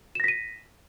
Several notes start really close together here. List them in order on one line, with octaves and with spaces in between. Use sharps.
E7 A#6 B6 D#7